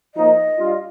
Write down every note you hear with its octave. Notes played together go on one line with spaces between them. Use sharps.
F3 A#3 D#4 D#5
G3 D4 F4